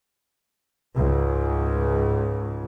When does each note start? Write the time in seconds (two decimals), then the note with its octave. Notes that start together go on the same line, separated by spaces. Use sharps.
0.96 C#2 G#2